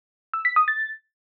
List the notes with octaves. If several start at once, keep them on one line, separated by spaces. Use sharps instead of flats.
E6
B6
D#6
A6